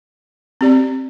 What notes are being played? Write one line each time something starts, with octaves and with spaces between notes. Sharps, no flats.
C4 G4 D5